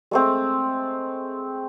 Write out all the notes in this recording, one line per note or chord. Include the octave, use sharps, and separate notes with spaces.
G#3 A3 C4